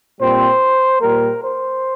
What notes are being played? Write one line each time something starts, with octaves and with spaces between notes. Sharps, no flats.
A#2 G3 C4 C5
A#2 G3 A#3 A#4
C5